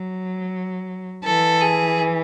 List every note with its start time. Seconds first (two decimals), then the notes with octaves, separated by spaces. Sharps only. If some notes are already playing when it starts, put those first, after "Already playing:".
Already playing: F#3
1.24 E3 A4
1.61 G#4